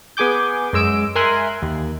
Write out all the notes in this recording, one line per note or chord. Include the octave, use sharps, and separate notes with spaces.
B3 G#4 G#5 D6 G6
F#2 G#3 E6 D7
A#4 E5 G#5 C6 F#6
D#2